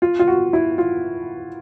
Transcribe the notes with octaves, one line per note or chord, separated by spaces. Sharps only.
F4
F4
F#4
E4
F4